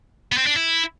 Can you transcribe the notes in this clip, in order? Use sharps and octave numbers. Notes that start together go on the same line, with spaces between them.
B3
C4
D4
E4